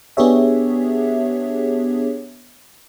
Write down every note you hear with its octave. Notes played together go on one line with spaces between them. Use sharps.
B3 D4 G4 G#4 C#5 E5